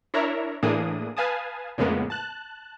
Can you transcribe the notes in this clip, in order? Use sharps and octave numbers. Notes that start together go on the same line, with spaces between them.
D4 E4 A#4 C#5 E5 A#5
A2 E3 A#3 D4 G#4 D#6
B4 F5 G#5 A5 D#6
F2 A2 C#3 G#3 A#3 B3
A5 F#6